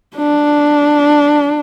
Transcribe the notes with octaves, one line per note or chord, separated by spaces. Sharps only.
D4